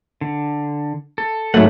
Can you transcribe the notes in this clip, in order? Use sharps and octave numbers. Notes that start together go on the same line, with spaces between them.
D3
A4
G#2 F#3 A3 F#5 B5